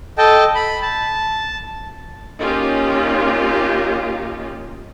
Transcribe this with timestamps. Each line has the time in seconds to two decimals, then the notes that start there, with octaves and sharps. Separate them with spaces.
0.18 A4 D#5 G5 A5
0.55 B5
0.82 A5
2.40 A#3 C#4 D#4 F4 G4